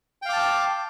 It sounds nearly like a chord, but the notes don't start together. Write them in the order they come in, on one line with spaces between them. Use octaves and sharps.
G5 F5 D6 A5